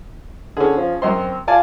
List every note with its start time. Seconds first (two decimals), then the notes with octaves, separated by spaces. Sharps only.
0.57 D3 C#4 G#4
0.77 F3
1.02 F#2 C4 D#5 C6
1.48 F4 D5 G#5 A5